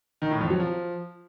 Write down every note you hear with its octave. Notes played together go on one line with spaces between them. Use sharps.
D#3
A2
F2
F#3
F3